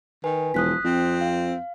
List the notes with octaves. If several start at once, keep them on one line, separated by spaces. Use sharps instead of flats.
D#3 B4 G#5
E1 F3 D#6 F#6 B6
F2 C4
F5